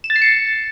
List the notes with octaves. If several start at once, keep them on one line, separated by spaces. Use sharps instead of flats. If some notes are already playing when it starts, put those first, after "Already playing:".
E7
A6
C7
C#7